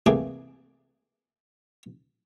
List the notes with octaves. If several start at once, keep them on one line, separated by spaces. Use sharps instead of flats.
C2 E3 A3 A#3 G#4 D6